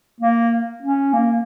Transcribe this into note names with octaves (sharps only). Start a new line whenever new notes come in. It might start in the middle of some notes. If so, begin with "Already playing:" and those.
A#3
C#4
A#3